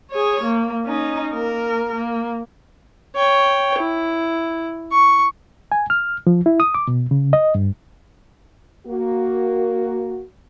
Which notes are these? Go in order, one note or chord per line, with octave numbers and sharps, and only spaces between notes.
G#4 C#5
A#3
C#4 D#4
A#3 A#4
A#3
C#5 G5
E4
C#6
G#5
F6
F3
E4
D#6
D6
B2
C#3
D#5
G2
A#3 F#4